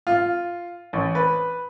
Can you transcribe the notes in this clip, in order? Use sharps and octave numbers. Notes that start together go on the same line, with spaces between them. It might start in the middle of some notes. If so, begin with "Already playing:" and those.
F4
A1
B4